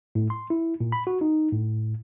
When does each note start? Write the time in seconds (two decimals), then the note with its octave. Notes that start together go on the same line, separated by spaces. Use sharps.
0.15 A2
0.30 C6
0.50 E4
0.80 A#2
0.92 B5
1.07 F#4
1.21 D#4
1.52 A2